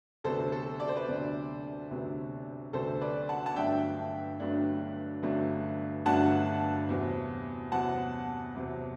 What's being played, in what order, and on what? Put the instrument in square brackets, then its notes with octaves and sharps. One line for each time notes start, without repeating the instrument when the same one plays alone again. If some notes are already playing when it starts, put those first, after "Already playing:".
[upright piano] D2 C3 F#3 B3 D4 A4 C5
A4
D5
C5
B4 D5
D2 C3 F#3 B3 D4
D2 C3 F#3 B3 D4
D2 C3 F#3 B3 D4 A4 C5
B4 D5
F#5 A5
A5
G1 G2 F#3 A3 D4 E5 G5
G1 G2 F#3 A3 D4
G1 G2 F#3 A3 D4
G1 G2 F#3 A3 D4 F#5 A5
E2 C3 F#3 C4
E2 C3 F#3 C4 F#5 A5
E2 C3 F#3 C4